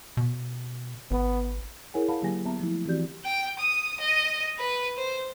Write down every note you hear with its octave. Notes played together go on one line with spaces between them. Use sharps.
B2
G#1 B3
E4 G#4 A#4 C#5 F#5 G#5
F5 F#5 A5 B5
D3 F#3 A#3 G4 G#5 A#6
B3 E5 A5 A#5
F3 A3 E4
E3 C4 F#4 G4 D5 G6
G5
D#6
D#5
B4
C5